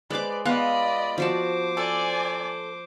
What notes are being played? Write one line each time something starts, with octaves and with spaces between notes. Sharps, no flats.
G#3 B4 C5 D5 D6
B3 F4 D5 D#5 F5 B5 F#6
F3 F#4 C5 A5 D6
A4 D5 G#5